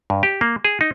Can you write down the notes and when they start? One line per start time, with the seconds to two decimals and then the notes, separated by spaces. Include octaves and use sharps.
0.10 G2
0.23 G4
0.41 A#3
0.65 G#4
0.81 D#4